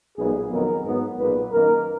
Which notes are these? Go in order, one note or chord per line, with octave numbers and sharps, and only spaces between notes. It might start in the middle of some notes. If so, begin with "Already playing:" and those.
B1 A#2 G#3 B3 G#4
F2 D#3 F#3 B3 A#4
G#2 F#3 B3
B1 A#2 G#3 B3 B4
F#2 D#3 A#3 A#4